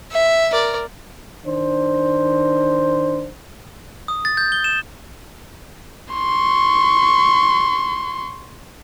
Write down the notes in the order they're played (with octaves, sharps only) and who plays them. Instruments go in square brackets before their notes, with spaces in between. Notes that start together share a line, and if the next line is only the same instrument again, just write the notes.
[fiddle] E5
A#4 D5
[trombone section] D#3 D4 C5
[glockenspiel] D#6
A6
G6
G7
E7
[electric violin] C6 C#6